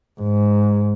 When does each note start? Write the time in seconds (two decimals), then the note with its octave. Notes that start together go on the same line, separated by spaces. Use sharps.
0.21 G#2